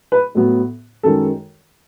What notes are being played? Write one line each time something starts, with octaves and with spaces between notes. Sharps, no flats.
B4
A2 F#3 B3
F#2 D#3 G#3 A4